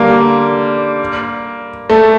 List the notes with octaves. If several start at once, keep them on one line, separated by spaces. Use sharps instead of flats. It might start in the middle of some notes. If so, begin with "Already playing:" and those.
Already playing: D3 G3 A#3
A3